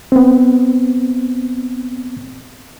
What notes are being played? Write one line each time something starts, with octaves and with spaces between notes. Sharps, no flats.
B3 C4